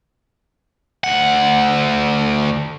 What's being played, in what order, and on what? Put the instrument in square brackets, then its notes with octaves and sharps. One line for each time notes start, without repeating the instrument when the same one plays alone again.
[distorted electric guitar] D2 F#5